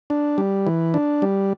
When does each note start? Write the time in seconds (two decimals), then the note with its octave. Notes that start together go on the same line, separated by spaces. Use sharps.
0.10 D4
0.38 G3
0.67 E3
0.94 D4
1.22 G3